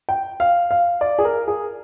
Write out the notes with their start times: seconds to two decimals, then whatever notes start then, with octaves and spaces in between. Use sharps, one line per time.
0.09 G5
0.40 F5
0.71 F5
1.01 D5
1.19 G#4
1.25 A#4
1.48 G#4